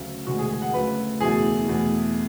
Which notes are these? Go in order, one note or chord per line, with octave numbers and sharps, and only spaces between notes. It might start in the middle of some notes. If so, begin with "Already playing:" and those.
Already playing: D2 C#3 F#3 A3
E1 D2 D3 G#3 F#4
G#4
G#4
F#5
D2 C#3 F#3 A3 B4
F#1 E2 B2 F#3 A3 G#4
E2 B2 A3